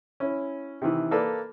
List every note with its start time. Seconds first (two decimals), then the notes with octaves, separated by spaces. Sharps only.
0.20 C#4 E4
0.82 C3 D#3 E3
1.11 A#3 A4 B4 D5